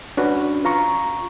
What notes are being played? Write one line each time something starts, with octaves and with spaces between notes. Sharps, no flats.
C#4 D4 F#4 B4
F4 A#5 C#6